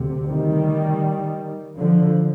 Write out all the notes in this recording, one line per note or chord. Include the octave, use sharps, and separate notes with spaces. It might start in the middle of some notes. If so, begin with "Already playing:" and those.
Already playing: D2 C3
D#3 G3
D3 F3